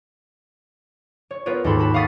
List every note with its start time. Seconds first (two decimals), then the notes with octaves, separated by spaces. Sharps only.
1.31 C#5
1.46 B3 F4 A#4 B4 C#5
1.64 D#2 G#2 A4 B5 C6
1.79 F#4 A5 B5
1.94 F5 F#5 C#6 D#6 A6 B6